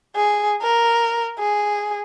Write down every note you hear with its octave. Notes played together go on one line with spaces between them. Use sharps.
G#4
A#4
G#4